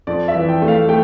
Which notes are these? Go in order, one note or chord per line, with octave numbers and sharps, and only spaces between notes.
F2 D5
E5
E3
G5
A3
F5
A3 G5